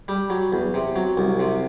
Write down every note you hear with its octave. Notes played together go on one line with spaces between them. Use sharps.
G3
F#3
E2
C3
F#3
C2
C3